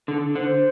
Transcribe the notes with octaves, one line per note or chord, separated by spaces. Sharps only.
D3 A4
D3 C5